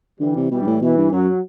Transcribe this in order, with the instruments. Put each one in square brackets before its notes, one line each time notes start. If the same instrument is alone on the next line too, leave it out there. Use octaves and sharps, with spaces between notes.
[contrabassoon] D3 [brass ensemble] E3 G3
[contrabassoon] C3
[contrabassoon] B2 [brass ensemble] E3 G3
[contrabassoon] G2
A2
[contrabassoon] B2 [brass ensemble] E3
[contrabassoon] G2
[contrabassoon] F#2 [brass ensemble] F#3